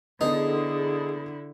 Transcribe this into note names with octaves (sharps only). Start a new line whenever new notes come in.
D3 B3 D#4 E4 G#4 A4